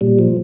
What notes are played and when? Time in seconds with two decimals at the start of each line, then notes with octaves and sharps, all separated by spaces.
0.01 A#2 G3
0.19 F3